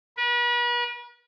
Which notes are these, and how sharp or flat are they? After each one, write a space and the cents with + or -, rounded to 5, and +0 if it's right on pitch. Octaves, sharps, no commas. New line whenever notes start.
B4 -40